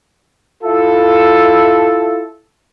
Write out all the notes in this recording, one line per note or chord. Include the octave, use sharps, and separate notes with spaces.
E4 F4 A4